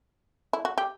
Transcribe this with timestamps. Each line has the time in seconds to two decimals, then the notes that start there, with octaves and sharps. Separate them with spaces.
0.53 E4
0.65 F#4
0.78 G4